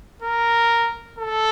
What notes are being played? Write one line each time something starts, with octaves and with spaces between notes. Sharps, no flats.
A#4
A4